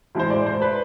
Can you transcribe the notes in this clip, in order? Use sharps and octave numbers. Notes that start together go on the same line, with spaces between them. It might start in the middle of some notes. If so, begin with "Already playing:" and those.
A2 E3 G#3 C5
D5
C5
B4